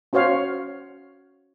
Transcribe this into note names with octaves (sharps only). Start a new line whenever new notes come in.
C#4 F#4 C5 C#5 F5